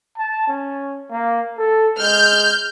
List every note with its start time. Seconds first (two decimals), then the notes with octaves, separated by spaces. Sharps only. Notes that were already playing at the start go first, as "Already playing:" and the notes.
0.18 A5
0.48 C#4
1.11 A#3
1.57 A4
1.99 G#3 F6 G6